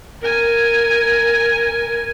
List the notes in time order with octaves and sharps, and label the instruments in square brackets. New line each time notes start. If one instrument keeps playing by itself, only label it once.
[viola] A#4 G#5